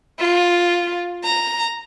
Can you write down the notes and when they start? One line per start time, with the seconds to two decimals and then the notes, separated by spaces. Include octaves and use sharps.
0.19 F4
1.24 A#5